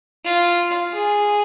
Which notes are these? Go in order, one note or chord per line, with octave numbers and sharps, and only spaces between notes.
F4
G#4